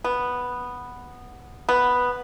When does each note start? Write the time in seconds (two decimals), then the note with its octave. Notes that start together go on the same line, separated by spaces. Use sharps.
0.04 B3
1.69 B3